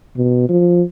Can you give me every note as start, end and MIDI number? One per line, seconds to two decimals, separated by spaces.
0.17 0.45 47
0.49 0.82 53